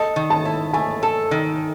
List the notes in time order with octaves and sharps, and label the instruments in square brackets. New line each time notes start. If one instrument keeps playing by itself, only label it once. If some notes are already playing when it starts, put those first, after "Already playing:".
Already playing: [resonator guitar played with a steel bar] A4 [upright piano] D#5
[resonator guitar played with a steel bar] D#3
[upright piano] A5
[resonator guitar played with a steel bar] E4
[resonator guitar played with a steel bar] A3 [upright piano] G#5
[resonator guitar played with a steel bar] A4
D#3